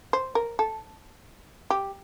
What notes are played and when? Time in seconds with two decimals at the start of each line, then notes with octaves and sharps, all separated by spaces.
0.13 C5
0.35 A#4
0.59 A4
1.70 G4